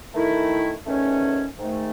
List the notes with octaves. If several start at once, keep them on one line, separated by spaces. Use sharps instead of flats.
D#3 A3 E4
E2 D#3 A3 C#4
G#2 D#3 A3